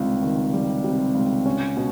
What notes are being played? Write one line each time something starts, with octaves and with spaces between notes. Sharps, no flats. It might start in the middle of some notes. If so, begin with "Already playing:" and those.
Already playing: C#2 C3 D#3 G3
D#3
G3
C3
C#2
C#4
B2